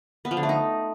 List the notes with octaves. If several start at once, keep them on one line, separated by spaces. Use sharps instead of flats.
B3
F3
D3
A3
D#4